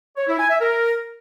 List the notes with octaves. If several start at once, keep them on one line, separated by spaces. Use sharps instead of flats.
C#5
E4
G#5
E5
A#4